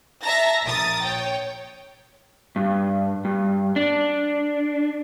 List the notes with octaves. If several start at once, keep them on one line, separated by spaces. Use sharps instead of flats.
E5 A5 A#5 A#6
A#1 A#4 D#6 A6
C#5 G5
G2
G2
D4